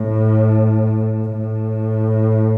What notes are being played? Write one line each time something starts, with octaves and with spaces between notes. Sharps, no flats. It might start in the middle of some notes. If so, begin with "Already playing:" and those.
Already playing: A2
A2